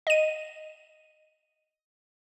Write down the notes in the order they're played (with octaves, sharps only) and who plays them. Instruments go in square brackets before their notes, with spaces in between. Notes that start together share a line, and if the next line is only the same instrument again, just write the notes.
[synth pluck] D#5 D#7